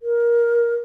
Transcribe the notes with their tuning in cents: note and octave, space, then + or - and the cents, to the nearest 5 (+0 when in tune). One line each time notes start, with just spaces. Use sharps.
A#4 +20